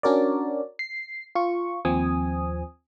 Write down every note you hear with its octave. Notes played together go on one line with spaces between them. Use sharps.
C#4 D4 F#4 A#4 C#5 D5
C7
F4 C#6
D#2 F3 C4 G#5 D#6